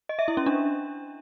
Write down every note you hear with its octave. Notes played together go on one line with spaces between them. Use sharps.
D#5
E5
E4
C#4
D4